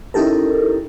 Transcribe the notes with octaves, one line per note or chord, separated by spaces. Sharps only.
C#4 D#4 E4 G4 A4 A#4